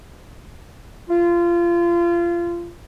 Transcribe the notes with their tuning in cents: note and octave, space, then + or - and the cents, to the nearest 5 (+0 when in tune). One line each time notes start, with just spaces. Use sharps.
F4 -25